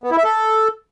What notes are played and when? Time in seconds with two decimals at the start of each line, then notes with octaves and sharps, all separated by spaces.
0.04 B3
0.10 E4
0.17 E5
0.24 A4